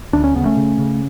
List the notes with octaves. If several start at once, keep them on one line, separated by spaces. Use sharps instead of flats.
D2 D4
C#4
C#3 B3
A3 C#4
C#3
C#3